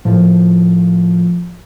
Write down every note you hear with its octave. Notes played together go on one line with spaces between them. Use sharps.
A2 F3